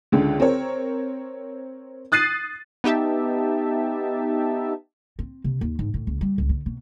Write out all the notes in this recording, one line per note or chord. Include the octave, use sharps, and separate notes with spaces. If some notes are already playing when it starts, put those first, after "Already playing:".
C#2 D3
C4 A#4 C#5
D#6 F#6 A6 C7 D#7
B3 D#4 G4 E5 A5
C4
C3
D#2
G#2
A2
C#2
G3
C#2
D3
B2